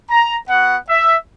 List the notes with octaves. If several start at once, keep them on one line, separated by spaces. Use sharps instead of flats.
A#5
B3 F#4 F#5
E5